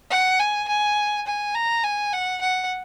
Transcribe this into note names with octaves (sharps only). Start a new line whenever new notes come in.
F#5
G#5
G#5
G#5
A#5
G#5
F#5
F#5